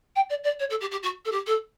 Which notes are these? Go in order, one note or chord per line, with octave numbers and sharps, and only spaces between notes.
G5
D5
D5
C#5
A4
G4
G4
F#4
A4
G4
A4